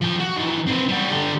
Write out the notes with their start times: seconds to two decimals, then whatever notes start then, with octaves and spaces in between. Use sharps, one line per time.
0.02 F3 G5
0.20 F#4
0.37 D#3 E3
0.67 C4 B4
0.88 G3 F#4
1.11 D3 G4